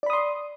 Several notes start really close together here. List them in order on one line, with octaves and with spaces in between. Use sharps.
D5 B5 D#6 C6